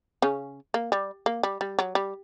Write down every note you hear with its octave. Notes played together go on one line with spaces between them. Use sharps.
C#3 C#4
A#3
G3
A#3
G3
G3
F#3
G3